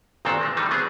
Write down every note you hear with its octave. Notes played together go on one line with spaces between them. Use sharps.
G1 A#2 D#3 F#3 C4 A4
G#3 A3
D#3 E3 G3 A3 D#4
F#3 B3 C4 G#4